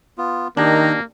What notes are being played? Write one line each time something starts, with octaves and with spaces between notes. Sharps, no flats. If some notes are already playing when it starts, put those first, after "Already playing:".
B3 F4
D#3 A#3 D4 D#4 G4 A#5